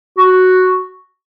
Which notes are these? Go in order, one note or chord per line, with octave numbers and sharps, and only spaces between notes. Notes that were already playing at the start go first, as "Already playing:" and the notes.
F#4